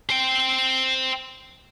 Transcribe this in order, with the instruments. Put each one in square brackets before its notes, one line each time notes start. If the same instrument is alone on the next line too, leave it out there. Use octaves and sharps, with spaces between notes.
[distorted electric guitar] C5 G5